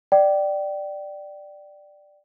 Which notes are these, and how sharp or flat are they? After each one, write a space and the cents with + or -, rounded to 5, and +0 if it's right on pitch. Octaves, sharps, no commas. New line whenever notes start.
D5 +10 G5 -25